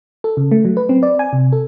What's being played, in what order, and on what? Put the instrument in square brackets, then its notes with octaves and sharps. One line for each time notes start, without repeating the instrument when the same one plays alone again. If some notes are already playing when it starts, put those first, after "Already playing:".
[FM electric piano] A4
C#3
A3
F#3
B4
C4
D5
G#5
C3
A4